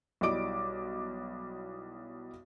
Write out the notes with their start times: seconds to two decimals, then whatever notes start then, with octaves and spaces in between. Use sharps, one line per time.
0.21 B1 G3 E4 D#5 D6 D7